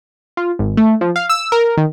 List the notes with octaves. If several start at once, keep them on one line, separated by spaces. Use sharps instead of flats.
F4
G#1
A3
F3
F5
E6
A#4
D#3